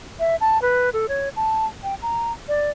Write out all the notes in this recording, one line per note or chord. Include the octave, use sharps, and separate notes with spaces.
E5
A5
B4
A4
C#5
A5
G5
A#5
D5